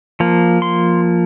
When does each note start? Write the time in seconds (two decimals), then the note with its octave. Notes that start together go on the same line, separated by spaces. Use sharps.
0.20 F3 A#3
0.62 C6